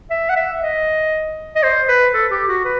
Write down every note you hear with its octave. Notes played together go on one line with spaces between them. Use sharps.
E5
F#5
E5
D#5
D#5
C5
B4
A4
G4
F#4
B4